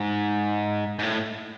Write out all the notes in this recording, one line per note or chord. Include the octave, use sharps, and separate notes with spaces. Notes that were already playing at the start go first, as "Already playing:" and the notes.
Already playing: G#2
G#2
A2